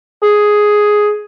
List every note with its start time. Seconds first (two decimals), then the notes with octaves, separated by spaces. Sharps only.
0.23 G#4